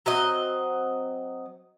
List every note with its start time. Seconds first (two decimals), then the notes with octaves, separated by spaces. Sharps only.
0.06 F#3 C4 D#5